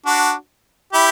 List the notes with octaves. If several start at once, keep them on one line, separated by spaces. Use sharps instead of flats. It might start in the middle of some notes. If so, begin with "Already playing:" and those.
D4 F#4
E4 G4